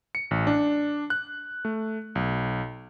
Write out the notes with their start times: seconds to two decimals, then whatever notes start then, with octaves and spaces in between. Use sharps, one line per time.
0.15 C#7
0.31 A1
0.47 D4
1.10 F#6
1.65 A3
2.15 B1